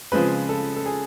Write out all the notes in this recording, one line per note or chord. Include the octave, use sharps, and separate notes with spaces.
C#3 F3 G#3 C4 B4
A4
A4
G#4